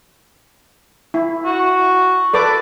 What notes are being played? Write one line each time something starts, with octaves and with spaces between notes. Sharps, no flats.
E4
F#4
A4 B4 D5 D6